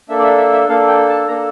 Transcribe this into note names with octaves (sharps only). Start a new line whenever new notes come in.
A#3 D4 A4 E5
D5
E5
E5
E5
A#3 D4 A4 F5
G5
A5
A#3 D4 A4 A#5